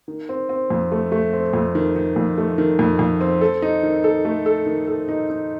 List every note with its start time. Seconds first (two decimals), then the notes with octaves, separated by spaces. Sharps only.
0.08 D#3
0.29 C4
0.49 C4
0.70 F2
0.92 A3
1.12 A3
1.33 C4
1.53 F2
1.75 D#3
1.96 D#3
2.16 F2
2.38 A3
2.58 D#3
2.79 F2
2.99 F2
3.21 C4
3.41 A4
3.62 D#4
3.83 D#3
4.04 A4
4.25 A3
4.46 A4
4.66 D#3
4.87 A4
5.09 D#4
5.29 D#4